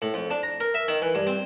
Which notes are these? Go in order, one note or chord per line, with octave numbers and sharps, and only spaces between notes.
A2
F2
D4
A#5
A#4
E5
D#3
E3
G2
C4